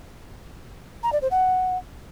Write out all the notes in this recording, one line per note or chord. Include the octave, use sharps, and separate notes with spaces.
A#5
D5
C5
F#5